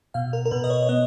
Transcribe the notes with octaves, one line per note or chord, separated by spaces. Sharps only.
B2 F5
A#4
A#4
B2 B4
D#5
C#5
C#5
B3 D#5